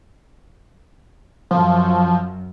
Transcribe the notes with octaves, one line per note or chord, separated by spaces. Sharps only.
F#2 F3